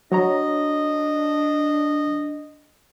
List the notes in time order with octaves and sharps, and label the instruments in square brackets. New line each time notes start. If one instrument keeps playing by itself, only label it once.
[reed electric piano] F#3 C#5 A#5 [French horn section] D4 [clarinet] D#5